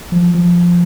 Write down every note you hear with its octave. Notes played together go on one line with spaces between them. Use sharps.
F3
F3